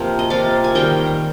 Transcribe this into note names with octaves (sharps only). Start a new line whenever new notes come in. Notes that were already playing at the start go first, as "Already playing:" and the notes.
Already playing: C3 F3 A#3
D#5
C3 F3 A#3 D5 F5
G#5
D#3 G3 A#3 D#5 G5